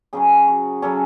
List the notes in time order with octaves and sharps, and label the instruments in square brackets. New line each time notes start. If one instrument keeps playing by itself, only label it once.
[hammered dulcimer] C#3 F#3 C#4 G#4
F#4
C#3 F#3 C#4 A4